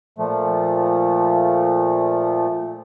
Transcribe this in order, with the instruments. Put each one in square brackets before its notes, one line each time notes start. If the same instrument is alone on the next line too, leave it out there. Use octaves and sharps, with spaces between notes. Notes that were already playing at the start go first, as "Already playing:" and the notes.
[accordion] A#2 F3 A3